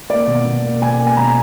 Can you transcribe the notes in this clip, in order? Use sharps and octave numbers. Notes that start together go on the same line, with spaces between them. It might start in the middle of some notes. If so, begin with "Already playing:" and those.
A#3 D5
B2
B2
A#3
B2 G#5
A#3
G#5
B2 A#5